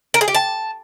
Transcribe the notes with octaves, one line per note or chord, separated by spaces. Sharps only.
A#4
G#4
G4
A5